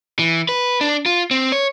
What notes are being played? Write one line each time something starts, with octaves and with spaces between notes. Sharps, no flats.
E3
B4
D4
F4
C4
C#5